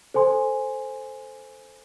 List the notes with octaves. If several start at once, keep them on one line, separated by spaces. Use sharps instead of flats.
A4 C5 G#5 C6